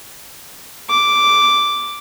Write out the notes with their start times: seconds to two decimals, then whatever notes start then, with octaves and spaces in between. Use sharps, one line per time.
0.90 D6